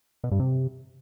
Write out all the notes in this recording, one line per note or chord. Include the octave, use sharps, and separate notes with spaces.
B2
G2
C3